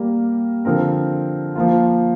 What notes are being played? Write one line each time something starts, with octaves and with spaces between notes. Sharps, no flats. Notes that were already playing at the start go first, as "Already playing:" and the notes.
Already playing: G3 A#3 G4 A#4
D3 F3 C4 A#4
F3 A#3 F4